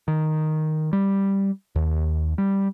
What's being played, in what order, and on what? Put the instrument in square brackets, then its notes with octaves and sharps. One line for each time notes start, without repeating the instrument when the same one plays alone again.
[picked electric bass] D#3
G3
D#2
G3